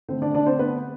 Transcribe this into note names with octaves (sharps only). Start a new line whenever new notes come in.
D3 A3 C4 C5
D4 D5
D4 D5
C4 C5
B3 B4